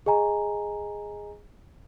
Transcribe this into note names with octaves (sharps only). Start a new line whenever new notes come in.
G#4 D#5 G#5 A#5